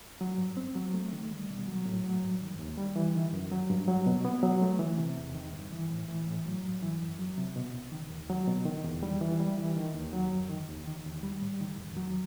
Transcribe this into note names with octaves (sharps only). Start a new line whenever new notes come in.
F#3
G2
C4
F#3
A3
D#3
G3
B2
F#3
A2
F#3
G2
D#3
D#2
G3
E3
D#3
F#2
F#3
G2
F#3
B2
B3
F#3
A3
E3
C3
E2
D#3
G2
E3
A2
E3
A2
F#3
G2
E3
F#2
F#3
C3
B2
C2
D#3
D#2
F#3
B2
D#3
E2
G3
E3
G3
E3
D#3
D#2
F#3
F#2
D#3
D#2
D#3
D#2
G3
A2
D#3
E2
F#3